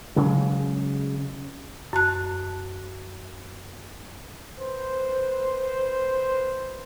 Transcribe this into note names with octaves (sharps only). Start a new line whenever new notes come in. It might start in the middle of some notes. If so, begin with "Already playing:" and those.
C#3 F#3 G#3
F#2 A5 F#6
B4 C5